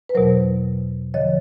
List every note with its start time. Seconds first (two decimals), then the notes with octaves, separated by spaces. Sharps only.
0.09 B4
0.15 E2 B2 F#3 A#4 C5
1.14 D3 F3 C#5 D#5